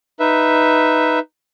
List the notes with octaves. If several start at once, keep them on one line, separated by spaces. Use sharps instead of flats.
D#4 B4 E5